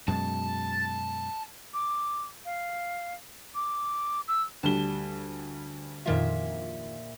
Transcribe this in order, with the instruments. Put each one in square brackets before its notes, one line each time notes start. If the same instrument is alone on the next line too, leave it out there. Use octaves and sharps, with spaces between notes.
[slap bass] F#2 B2 G#3 [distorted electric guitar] A5
[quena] D6
F5
D6
E6
[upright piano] D2 G3 G7 [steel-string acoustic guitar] A5
[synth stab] F2 D#3 F4 [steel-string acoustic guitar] A#2 E5